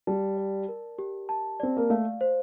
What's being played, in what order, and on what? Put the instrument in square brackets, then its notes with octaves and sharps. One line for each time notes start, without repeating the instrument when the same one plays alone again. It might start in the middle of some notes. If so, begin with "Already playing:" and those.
[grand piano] G3 [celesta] A5
[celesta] D5
A#4
G4
A5
[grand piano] C4 [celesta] D5
[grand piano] A#3
[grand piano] A3 [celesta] F5
[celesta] C5